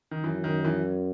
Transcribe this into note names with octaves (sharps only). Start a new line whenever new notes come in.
D#3
F#2 E3
D#3
E3